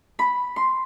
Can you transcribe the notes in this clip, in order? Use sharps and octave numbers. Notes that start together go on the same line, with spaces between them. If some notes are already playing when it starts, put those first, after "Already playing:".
B5
C6